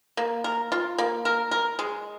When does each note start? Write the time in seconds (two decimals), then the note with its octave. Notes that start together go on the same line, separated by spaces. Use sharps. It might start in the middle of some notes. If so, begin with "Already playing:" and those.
0.17 A#3
0.44 A#4
0.72 F4
0.98 A#3
1.25 A#4
1.51 A#4
1.79 G#3